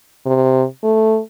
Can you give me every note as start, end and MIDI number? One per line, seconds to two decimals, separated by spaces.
0.26 0.65 48
0.84 1.20 57